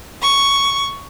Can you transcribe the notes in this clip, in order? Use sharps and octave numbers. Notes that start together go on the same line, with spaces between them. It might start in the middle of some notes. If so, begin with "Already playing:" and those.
C#6